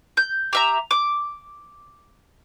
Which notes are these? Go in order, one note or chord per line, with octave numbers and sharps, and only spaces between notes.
G6
G4 E5 A#5
D6